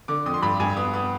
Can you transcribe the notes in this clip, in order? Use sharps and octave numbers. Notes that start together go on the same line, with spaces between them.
D3 D6
F2 D#6
C6
G2 B5
G2 G#5
B3 D#6
B3 D#6